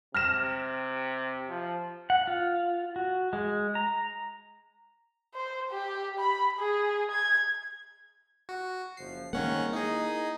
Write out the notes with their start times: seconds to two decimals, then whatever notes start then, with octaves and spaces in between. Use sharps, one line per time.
0.14 C3 F6 A#6 E7
1.49 F3
2.10 F#5
2.27 F4
2.96 F#4
3.33 G#3
3.75 A#5
5.35 C5
5.71 G4
6.19 B5
6.59 G#4
7.11 G#6
8.49 F#4
8.97 F#1 F3 C7
9.33 D#3 G3 G#3 A#3 C4 C#4 F#5
9.73 D#4 E4 G#4 A#4 D#5